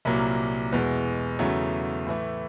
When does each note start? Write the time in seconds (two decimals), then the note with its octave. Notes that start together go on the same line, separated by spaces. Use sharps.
0.05 C2 A#2 F#3 A#3
0.72 E2 B2 G#3
1.39 E2 C#3 F#3 A3
2.07 A2 E3 A3